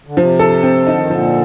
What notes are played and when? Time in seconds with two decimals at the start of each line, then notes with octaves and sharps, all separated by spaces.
0.07 D3
0.17 C3 F3
0.39 A4
0.63 C4
0.86 D3 D#4
0.98 D#3
1.10 A#2 D3 F3